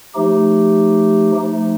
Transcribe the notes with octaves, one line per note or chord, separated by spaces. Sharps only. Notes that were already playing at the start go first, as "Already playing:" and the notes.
F3 A3 D#4 G4
F3 A3 D#4